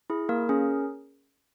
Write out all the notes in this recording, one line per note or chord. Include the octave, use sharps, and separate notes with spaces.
E4 G#4
A#3 A#4
C#4 G#4